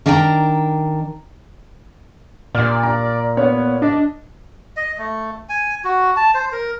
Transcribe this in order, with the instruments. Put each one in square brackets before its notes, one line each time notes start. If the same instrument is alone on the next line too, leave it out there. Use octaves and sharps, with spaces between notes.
[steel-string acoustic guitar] D#3 D4 A#4 G5 G#5 A#5
[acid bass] A#2 [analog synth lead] D5 [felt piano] F6
[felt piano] A#5
[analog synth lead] B3 [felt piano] C#5
[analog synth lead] D4 [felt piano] D#5
[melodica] D#5
A3
G#5
F#4
A5
C5
A#4